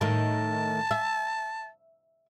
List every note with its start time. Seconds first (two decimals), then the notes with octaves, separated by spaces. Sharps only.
0.01 A2 D#3 A5
0.91 E5